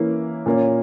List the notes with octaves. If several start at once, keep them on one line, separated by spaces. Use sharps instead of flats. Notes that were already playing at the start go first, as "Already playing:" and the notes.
Already playing: E3 A#3 C#4 E4
A#2 A#3 C#4